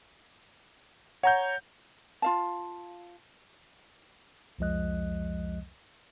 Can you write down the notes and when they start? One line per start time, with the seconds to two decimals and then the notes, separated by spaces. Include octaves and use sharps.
1.23 C#5 F#5 A#5 G6
2.22 F4 F5 A5
4.59 C2 F2 F3 G#3 D#5 F#6